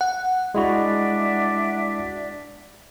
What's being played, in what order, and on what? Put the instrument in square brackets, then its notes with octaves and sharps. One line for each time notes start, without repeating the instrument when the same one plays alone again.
[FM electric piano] F#5
[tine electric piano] G#3 E4 F#4 [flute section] D4 D5 E5